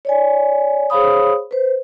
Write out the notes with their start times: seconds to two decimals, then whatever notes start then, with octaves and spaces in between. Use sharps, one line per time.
0.05 C#5 D5 G#5
0.90 G#4 C5 C#5 F5 B5 D#6
1.51 B4 C5